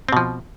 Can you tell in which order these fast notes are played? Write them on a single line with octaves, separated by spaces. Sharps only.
C4 B2 F3